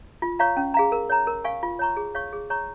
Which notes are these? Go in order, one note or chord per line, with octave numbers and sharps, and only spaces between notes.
F4
C#5 F5 A#5 C#6
C#4
G#4 F5 A#5
A#4
C#5 A#5
A#4
F5 G#5 C#6
F4
C#5 A#5 C#6
G#4
C#5 F5 C#6
G#4
C#5 A#5 C#6